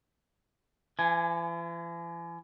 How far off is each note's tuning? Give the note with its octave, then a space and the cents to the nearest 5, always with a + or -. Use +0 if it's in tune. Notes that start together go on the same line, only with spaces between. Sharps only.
E3 +45 G#5 +0